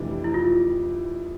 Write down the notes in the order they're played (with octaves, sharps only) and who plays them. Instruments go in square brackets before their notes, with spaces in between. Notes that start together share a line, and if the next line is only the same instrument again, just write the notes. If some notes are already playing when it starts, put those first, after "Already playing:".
Already playing: [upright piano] F1 F2 E3 G3 D4
[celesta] E4
F4